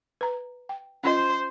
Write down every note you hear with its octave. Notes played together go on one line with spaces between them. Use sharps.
B4 A#5
G5
C#4 F4 C5 D#5